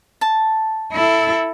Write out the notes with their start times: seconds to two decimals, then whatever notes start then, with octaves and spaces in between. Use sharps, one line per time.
0.21 A5
0.92 E4 A4